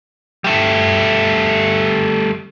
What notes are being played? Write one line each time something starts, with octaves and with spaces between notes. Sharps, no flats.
G3 A3